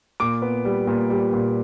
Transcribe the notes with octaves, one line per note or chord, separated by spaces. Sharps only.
A#2 D6
B3
G3
A#2
G3
A#2